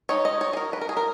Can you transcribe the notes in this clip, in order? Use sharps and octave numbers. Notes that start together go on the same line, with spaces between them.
G#3 D#4 C#5
D#5
C#5
G#4
A#4
B4
A#4
G#4
A#4